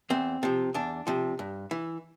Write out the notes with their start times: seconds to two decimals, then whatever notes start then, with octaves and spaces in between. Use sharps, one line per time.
0.10 E2 C4
0.43 C3 F3
0.74 E2 D4
1.07 C3 F3
1.39 G2
1.71 E3